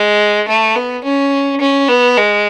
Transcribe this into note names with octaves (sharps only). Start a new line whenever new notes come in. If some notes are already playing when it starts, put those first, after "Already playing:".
Already playing: G#3
A3
B3
C#4
C#4
B3
G#3